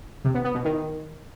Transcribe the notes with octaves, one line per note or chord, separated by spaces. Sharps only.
C3
B3
B3
B2
D#3